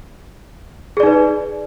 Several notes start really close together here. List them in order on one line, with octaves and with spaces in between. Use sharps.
G#4 D5 D#4 B4